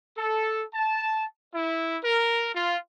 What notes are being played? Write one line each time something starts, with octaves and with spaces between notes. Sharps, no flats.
A4
A5
E4
A#4
F4